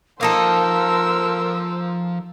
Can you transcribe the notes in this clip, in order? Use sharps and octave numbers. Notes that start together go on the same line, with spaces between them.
F3 A#3 D#4 A4 A#4 C5 F5 E6